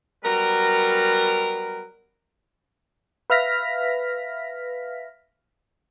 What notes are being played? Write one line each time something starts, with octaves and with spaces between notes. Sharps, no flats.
F#3 G3 B3 A#4
B4 E5 F5 F6 A#6 B6